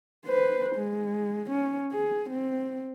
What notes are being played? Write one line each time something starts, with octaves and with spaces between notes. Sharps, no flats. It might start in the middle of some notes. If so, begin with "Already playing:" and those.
B4 C5
G#3
C#4
G#4
C4